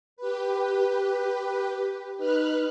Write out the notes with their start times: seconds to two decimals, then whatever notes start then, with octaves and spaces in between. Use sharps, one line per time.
0.17 G4 B4
2.18 D#4 B4 F6 F#6